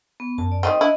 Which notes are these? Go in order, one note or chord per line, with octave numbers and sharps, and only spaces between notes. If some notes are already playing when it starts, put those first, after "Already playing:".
B3
F#2 A5
D5
D#3 G3 C4 D#5 D#6
D4 E4 D#5